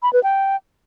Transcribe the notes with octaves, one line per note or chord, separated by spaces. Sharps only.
B5
B4
G5